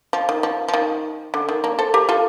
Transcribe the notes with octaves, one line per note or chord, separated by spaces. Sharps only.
F3
D#3
F3
F3
D#3
D3
D#3
A#3 D4
A4 C5
G4 A#4
F4 A4